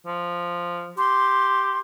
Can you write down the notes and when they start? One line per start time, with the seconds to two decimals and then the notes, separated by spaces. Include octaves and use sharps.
0.06 F3
0.98 G4 C6